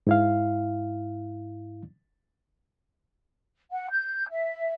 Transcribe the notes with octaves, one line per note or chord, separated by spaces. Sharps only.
G#2 E4 F5
F#5
G6
E5